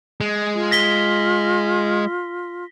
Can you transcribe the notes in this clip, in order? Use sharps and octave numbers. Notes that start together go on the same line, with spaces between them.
G#3
F4
A#6 B6 G7